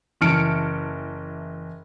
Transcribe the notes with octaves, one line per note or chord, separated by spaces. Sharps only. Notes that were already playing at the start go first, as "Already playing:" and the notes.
F#1 E3 A5 F6 C#7 D7